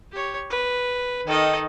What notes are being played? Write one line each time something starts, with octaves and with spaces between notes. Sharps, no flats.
G4 C#5
B4
D#3 A4 D#5